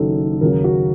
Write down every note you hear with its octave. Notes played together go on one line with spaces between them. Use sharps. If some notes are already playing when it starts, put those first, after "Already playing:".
Already playing: F#1 F#2 D#3 A4
D#2 C#3 F#3 A#4
F#4